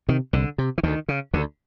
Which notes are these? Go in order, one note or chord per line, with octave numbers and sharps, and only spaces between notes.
C3 D#3
C2 D3
C3
E3
D2 D#3
C#3
D2 D3